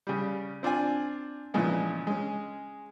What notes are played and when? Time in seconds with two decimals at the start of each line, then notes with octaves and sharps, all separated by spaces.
0.07 C#3 G3
0.63 C4 D4 F4 G#5
1.54 A#2 C#3 E3 F3 G#3 B3
2.07 G#3 C#4